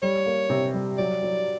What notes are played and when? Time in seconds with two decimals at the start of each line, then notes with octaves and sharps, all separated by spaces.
0.02 G3 C#5
0.26 A#3
0.50 C3
0.74 G3
0.98 F#3 D5
1.22 F#3